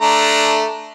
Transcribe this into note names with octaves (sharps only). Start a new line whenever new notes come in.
A3 D4 A#5